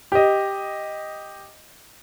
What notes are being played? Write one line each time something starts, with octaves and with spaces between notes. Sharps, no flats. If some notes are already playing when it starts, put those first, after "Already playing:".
G4 D#5